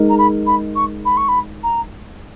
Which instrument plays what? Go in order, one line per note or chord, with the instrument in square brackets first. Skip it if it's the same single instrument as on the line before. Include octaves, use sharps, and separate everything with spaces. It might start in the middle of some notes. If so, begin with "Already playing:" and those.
Already playing: [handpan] G#3 D#4 A#4
[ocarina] A#5
B5
B5
C#6
B5
C#6
B5
A#5